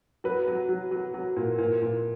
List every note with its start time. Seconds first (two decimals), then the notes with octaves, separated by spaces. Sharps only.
0.24 F#3 B4
0.47 F#3
0.69 F#3
0.91 F#3
1.14 F#3
1.36 A#2
1.58 A#2
1.82 A#2